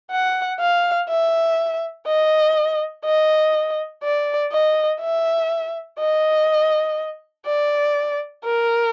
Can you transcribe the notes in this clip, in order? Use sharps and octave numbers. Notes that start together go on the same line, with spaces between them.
F#5
F5
E5
D#5
D#5
D5
D#5
E5
D#5
D5
A#4